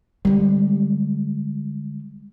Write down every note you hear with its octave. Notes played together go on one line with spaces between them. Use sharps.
D3 G3 G#3